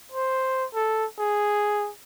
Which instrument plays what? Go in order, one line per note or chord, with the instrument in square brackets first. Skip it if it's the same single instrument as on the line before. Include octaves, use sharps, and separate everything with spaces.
[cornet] C5
A4
G#4